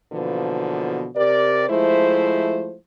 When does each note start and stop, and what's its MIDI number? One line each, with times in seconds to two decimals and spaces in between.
0.13 1.07 47
0.13 1.07 50
0.13 1.07 52
0.13 1.07 53
0.13 1.07 58
0.13 1.07 59
1.16 1.65 48
1.16 1.65 67
1.16 1.65 70
1.16 1.65 74
1.69 2.76 53
1.69 2.76 56
1.69 2.76 57
1.69 2.76 64
1.69 2.76 72